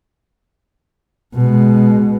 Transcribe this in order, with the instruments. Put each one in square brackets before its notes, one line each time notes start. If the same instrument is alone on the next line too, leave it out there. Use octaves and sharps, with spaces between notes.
[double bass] B2 G#3